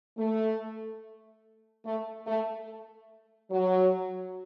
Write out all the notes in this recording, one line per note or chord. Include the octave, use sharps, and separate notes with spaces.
A3
A3
A3
F#3